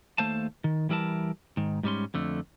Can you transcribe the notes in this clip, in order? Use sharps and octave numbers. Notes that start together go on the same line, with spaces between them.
D#2 A3 C5 F5 A5
D#3
E3 G3 E4 A#4 A5
G#2 D#3
G#2 G3 C#4 C6
F2 D3 A3